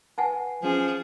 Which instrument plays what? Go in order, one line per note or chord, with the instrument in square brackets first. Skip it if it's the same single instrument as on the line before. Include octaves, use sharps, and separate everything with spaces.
[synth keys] B4 [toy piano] F#5 G#5 A5
[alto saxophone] F3 [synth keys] F#3 C#4 [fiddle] G#4